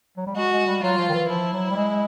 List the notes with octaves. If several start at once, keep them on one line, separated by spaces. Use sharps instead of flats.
F#3
G3
G#3 F#4
G#3
G3
F#3 F4
F3
D#3
E3
F3 E4
F#3
G3
G#3